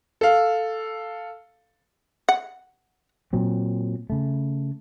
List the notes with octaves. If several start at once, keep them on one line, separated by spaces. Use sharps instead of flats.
A4 F5
F#5
A#2 F#3 C4
C#3 A3